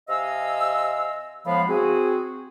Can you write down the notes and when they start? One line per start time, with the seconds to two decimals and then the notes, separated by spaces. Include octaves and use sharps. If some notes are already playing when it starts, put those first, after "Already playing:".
0.09 C3 D#5 F5 G#5 E6
1.46 A2 F3 G#3 B3 F5 B5
1.68 C4 F#4 G#4